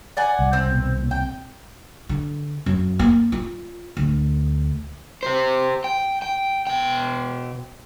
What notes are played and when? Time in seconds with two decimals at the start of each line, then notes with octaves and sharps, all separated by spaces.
0.17 D5 F#5 G#5
0.39 C2
0.53 C#2 C4
0.71 B2 D#3
0.98 D#2
1.11 C4 G5
2.09 D3
2.66 F#2
2.99 A#3
3.32 F4
3.97 D2
5.23 G4 C5
5.84 G5
6.22 G5
6.67 B2 G5